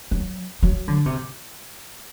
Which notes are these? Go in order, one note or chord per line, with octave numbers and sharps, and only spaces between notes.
F#3
F#3
D3
C3